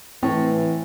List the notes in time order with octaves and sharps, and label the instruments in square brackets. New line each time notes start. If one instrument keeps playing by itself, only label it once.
[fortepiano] A2 [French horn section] E3 [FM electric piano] C4